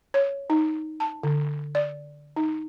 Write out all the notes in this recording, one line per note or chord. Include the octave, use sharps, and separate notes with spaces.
C#5
D#4
A5
D3
D5
D#4